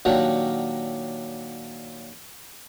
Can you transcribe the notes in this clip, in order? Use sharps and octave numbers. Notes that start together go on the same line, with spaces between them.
A#2 D#3 F#3 D4 F#4 G4